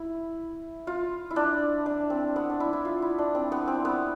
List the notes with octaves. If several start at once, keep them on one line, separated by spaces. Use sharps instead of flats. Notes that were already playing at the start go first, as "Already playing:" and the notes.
Already playing: E4
F4
E4
D4
D4
C4
B3
D4
E4
E4
F4
E4
D4
C4
B3
C4
B3